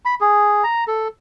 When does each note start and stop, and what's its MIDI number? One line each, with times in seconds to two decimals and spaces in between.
0.05 0.15 83
0.21 0.64 68
0.64 0.84 82
0.88 1.08 69